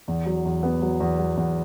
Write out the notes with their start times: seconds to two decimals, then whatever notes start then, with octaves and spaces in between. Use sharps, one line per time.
0.08 E2
0.26 F#3
0.45 E2
0.63 B3
0.82 F#3
1.00 E2
1.19 F#3
1.37 E2